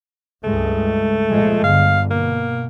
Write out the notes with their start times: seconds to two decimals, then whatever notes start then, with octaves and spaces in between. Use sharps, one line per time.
0.44 C#2 G2 G#3 A3
1.29 A#2 F3 G#3
1.64 G1 D3 F5
2.11 B2 A#3